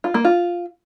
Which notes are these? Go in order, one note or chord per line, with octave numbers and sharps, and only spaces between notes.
F4
A#3
F4